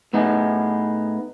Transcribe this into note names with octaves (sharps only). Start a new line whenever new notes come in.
A2 B3 D#4 G#4